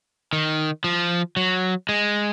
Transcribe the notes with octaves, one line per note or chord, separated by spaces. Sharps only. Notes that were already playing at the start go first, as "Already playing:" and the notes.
D#3
F3
F#3
G#3